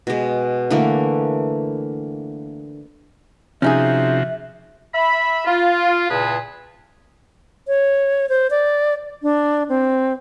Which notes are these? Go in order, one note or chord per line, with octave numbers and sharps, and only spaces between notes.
B2 G#3
D3 E3 A3 A#3
C3 F3 C#4 D#4 F#4 G#4 E5
E5 B5
F4
E2 A#2 C#3 G#4 B4 A5
C#5
C5
D5
D4
C4